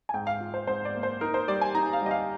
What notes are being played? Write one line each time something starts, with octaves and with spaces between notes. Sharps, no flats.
G#5
G#2 G5
F5
F4
C5
G#2 C5
D5
A#3
C5
D#4 A#4
C5
G3 D5
G#5
D#4 A#5
F5
G3 D#5
F5